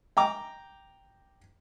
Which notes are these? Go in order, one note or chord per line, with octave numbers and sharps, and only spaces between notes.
G5 A#5 D6